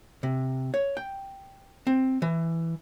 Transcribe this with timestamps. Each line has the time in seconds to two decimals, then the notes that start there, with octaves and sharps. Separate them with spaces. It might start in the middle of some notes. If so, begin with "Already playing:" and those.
0.23 C3
0.74 C#5
0.97 G5
1.87 C4
2.22 E3